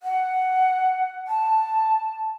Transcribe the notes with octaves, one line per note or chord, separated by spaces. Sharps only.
F#5
A5